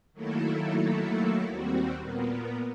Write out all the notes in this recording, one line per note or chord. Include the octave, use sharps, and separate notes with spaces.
D#3 F#3 A3 A#3 E4 A4
D#2 G3 C4 F#4
A#2 A#3 B3